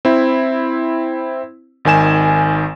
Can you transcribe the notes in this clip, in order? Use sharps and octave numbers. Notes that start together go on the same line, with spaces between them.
C4 E4
G#1 D#3 G#5 E7